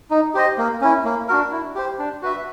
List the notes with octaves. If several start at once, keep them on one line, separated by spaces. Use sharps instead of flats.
D#4
G4 C5 D#5
A#3
C#4 E4
A#3
D4 F#4 A#4
E4
G4 C5
D4
F#4 B4 E5